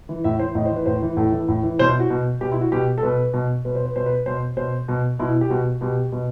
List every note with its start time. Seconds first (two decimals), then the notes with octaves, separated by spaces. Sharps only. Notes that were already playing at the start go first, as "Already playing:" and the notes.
0.09 E3
0.24 A2 E5
0.39 E3 C5
0.55 A2 D#5
0.65 C5
0.71 E3
0.76 B4
0.86 A2 C5
1.02 E3
1.17 A2 A4
1.32 E3
1.48 A2
1.63 E3
1.79 B2 C5
1.90 E4
2.00 F#4
2.10 B2
2.41 B2 G4
2.52 E4
2.61 F#4
2.72 B2 G4
2.98 A4
3.03 B2 B4
3.33 B2
3.65 B2 B4
3.75 C5
3.85 B4
3.96 B2 C5
4.06 B4
4.26 B2 C5
4.57 B2 C5
4.88 B2
5.19 B2 E4
5.41 G4
5.50 B2 F#4
5.81 B2 G4
6.12 B2